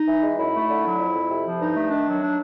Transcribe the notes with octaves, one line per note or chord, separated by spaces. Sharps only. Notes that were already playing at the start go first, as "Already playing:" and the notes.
Already playing: D#4
E3
G#3
F#2 E4
A3
D3
F#3
F2
F2
C3
F3
G2 D#4
A3
D#3 D4
F#3
D4